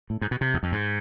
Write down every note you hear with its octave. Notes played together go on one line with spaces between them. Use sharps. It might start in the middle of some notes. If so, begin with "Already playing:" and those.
A2
G#2
B2
C3
E2
F2
G#2